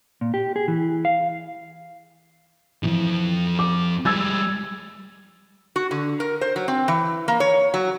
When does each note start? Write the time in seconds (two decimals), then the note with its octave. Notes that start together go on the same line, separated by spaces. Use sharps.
0.21 A#2
0.34 G4
0.56 G#4
0.68 E3
1.05 F5
2.83 F2 G#2 E3
3.59 D6
4.05 G3 G#3 E6 G#6 A6
5.76 F#4
5.91 D3
6.20 A#4
6.41 C5
6.56 F#3
6.68 C4
6.88 E3
7.28 A#3
7.40 C#5
7.74 F#3